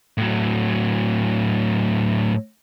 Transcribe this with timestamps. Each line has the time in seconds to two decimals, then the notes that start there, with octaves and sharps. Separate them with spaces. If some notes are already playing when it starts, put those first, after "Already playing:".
0.18 A2 F#3